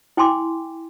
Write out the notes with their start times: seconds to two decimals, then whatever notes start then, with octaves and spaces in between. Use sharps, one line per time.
0.17 E4 G5 G#5 C6 D6